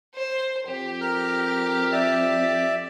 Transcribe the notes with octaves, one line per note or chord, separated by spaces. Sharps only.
C5
F2 G4
A#4 F6
D5 E5